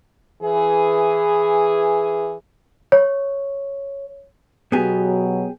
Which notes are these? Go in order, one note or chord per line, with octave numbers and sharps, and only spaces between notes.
E3 G#4
C#5
B2 F#3 B3 G4 G#4